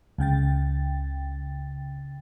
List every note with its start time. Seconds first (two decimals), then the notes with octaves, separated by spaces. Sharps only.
0.18 C#2 C#3 G5 A6